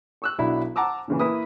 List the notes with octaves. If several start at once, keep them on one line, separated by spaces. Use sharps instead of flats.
C#6 E6 F#6
B1 F#3 D4 E4
F#5 A5 A#5 D6 E6
A#2 C#3 E3
A#3 E4 B4 D#6